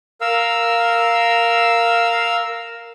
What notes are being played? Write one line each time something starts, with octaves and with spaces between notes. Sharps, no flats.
A#4 F5 E6